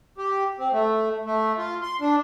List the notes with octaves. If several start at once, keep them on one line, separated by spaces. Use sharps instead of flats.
G4
C4
A3
A3
F4
C6
D4